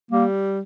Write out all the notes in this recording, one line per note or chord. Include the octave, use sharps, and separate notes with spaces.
G3 A#3